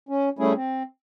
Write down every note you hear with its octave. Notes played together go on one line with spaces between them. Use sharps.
C#4
G3 A3 C#4 E4 G#4
C4